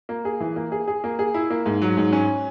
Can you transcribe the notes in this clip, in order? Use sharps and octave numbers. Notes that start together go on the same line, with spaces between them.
A#3
G#4
E3
A#3
G#4
G#4
A#3
G#4
E4
A#3
G#2
F#3
G#2
C#4